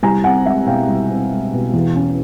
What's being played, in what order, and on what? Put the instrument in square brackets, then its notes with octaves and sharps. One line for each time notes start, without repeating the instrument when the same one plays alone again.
[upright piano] C2 G#5 A#5
C4 F#5 G#5
G#3 E5 F#5
B2 F5 G5
C2
C4
G#3
B2
E2
C#4